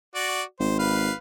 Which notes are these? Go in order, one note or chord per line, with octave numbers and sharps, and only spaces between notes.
F#4 D5
G#1 C5
B4 F5